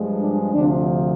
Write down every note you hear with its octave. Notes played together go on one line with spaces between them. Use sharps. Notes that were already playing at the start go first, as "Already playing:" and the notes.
Already playing: G2 F3 G#3
D4
D2 C3 F3 D4